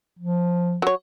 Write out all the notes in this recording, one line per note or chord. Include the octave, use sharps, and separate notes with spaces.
F3
F#3 C#5